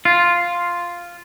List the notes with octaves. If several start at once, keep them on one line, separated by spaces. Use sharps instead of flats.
F4